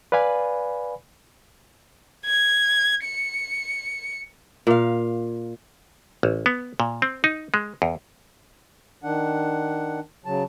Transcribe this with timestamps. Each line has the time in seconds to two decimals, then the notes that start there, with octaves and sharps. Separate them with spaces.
0.12 B4 D5 F5 G#5 B5
2.26 G#6
3.05 C#7
4.67 A#2 F5
6.23 A1
6.46 B3
6.80 A#2
7.02 C4
7.24 D#4
7.54 G#3
7.82 E2
9.04 D#3 D4 F#5
10.25 C#3 F#3 A5